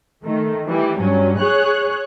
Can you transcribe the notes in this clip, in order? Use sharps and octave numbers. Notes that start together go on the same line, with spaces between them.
D#3 A3
E3 G3
G2 F#3 C#4
G#4 C#5 F#6